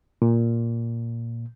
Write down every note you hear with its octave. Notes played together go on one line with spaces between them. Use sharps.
A#2